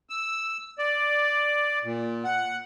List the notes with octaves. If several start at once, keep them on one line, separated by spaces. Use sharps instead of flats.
E6
D5
A#2
F#5